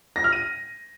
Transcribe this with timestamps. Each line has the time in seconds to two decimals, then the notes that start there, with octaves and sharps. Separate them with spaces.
0.16 A#6
0.24 F6
0.33 D#7